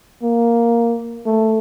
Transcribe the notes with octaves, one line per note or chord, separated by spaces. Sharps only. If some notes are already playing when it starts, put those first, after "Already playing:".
A#3
A3